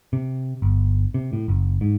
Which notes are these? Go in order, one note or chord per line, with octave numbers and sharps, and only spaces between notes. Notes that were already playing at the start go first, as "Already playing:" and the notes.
C3
G1
C3
A2
F#1
G#2